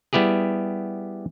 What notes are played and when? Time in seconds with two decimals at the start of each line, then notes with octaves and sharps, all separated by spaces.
0.13 G3 B3 E4 G4 G#4